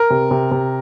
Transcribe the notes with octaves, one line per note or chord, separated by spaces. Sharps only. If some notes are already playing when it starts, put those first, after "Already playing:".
Already playing: A#4
C3
C3
C3